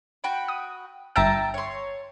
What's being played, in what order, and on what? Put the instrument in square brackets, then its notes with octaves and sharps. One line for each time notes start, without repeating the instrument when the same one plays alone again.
[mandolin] F#4 G5 B5
[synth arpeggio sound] D#6
[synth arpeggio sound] G1 E5 E6 [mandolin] G5 A5 A#5
[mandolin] C#5 C6